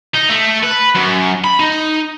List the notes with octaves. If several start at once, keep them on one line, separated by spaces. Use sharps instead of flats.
D#4
A3
B4
F#2
B5
D#4